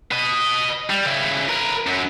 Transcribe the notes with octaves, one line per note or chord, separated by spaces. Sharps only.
B4 D#5
G3
C#3 E4
A#4 B4
F#2